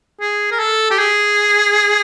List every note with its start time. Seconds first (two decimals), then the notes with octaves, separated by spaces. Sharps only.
0.21 G#4
0.51 A#4
0.59 A4
0.90 G4
0.99 G#4